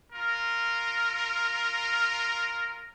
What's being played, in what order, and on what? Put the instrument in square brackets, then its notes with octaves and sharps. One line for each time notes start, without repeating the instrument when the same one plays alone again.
[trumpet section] F4 A#4